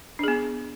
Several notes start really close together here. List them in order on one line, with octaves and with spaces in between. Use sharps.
D4 G#4 B3